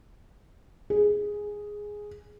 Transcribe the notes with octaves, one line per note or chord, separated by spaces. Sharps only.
G#4